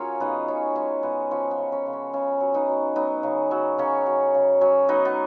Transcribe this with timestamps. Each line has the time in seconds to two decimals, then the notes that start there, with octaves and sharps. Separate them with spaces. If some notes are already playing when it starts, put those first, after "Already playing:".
Already playing: F#3 C#4 F4 G#4 A#4 C#5
0.20 C#3 B3 D#4
0.48 C#3 C#4
0.76 G#3 C#4
1.03 C#3 B3
1.31 F3 C#4
1.51 B3
1.58 C#3
1.72 C#4
1.86 C#3
1.93 C#4
2.13 C#3 C#4
2.40 F#3
2.54 B3 D#4
2.69 F#3
2.96 F#3 B3 D#4
3.23 C#3
3.51 F#3
3.78 C#3 C#4
4.06 F#3
4.34 C#3
4.61 F#3 C#4
4.88 F#3 B3 D#4
5.05 B3